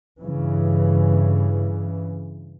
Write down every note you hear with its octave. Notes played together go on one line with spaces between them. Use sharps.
G2 C#3 E3